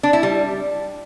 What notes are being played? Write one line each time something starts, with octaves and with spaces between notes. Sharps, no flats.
D4
E4
G3